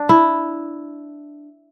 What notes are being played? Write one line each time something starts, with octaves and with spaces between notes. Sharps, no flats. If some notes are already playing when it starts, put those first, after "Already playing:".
Already playing: D4
E4